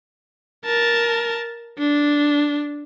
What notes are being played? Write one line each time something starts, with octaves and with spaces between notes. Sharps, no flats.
A#4 A5
D4